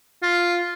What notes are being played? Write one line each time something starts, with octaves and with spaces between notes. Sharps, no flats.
F4